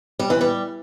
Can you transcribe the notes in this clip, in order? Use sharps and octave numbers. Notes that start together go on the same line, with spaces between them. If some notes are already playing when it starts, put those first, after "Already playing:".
G3
E3
G3